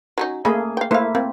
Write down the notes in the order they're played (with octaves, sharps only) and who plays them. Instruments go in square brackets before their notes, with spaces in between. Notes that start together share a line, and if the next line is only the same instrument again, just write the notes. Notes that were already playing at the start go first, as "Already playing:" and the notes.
[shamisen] F#3 C#4 D#4
[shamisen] C#3 D#5 B5 [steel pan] A3 A#3 G#4
[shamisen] F5 G5
[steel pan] A3 A#3 E4 [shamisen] C5 F5
[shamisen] A#3 [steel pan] C4